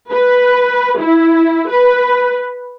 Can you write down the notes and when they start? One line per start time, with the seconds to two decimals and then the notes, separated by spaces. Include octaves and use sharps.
0.11 B4
0.99 E4
1.69 B4